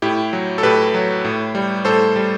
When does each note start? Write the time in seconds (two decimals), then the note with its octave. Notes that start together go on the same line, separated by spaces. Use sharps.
0.02 A2 E4 G4
0.33 F#3
0.58 A4
0.63 A2 G4 B4
0.94 F#3
1.25 A2
1.55 G3
1.85 A2 A4 C5
2.16 G3